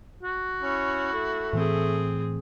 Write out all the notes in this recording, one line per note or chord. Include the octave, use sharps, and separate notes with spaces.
F#4
C#4 E4
A3
A2 E3 C4 G#4